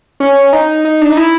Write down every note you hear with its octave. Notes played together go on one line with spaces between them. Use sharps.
C#4
D#4
D#4
D4
D#4
E4